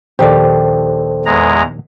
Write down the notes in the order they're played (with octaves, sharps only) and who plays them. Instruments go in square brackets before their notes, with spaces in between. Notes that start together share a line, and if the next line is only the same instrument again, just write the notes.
[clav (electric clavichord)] A#1 D#2 [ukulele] G4 D5 [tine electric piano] A4 C5
[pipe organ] E2 G#3 A#5